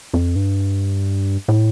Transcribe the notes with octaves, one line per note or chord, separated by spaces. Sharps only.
F2
G2
A2